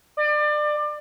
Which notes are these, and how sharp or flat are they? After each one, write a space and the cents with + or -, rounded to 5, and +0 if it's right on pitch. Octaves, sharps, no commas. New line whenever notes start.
D5 +30